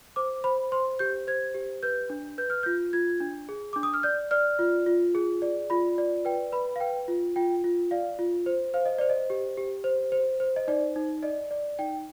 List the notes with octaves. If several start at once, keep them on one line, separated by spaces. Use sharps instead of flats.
C5 D6
C5 B5
C5 C6
G4 G6
C5 G#6
G4
B4 G6
D4
B4 G6
F6
F4 G6
F4 G#6
D4
G#4
D4 D6
D#6
F6
D5 G6
D5 F6
F4
F4
G#4
D5
F4 B5
D5
B4 G5
B4 B5
F5
B4 G5
F4
F4 G5
F4
D5 F5
F4
C5
C5 F5
D#5
C5 D5
D#5
G4
G4
C5
C5
C5
D#5
D#4 D5
D#4
D5 D#5
D5
D#4 G5